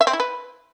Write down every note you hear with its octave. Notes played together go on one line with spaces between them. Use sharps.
E5
C4
E4
B4